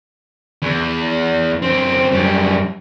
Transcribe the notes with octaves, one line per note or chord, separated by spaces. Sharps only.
E2
F#2 C4
F#2 G3